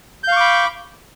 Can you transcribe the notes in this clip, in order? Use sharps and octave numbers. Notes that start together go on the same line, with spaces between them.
F5 B5 C#6 D6 G6